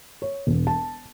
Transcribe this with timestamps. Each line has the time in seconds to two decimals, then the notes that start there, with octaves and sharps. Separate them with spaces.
0.22 C#5
0.47 E1
0.67 A5